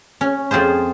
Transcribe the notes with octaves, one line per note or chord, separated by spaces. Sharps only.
C#4
F2 C4 F4 G#4 C5